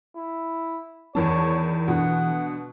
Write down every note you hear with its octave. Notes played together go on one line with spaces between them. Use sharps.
E4
E2 D#3 E3 C#5 A5
B2 D3 F#5